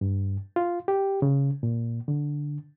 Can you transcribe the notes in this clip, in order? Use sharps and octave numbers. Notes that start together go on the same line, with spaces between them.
G2
F4
G4
C#3
A#2
D3